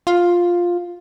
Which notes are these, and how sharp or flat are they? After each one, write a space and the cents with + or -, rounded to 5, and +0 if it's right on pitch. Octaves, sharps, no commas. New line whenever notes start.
F4 +5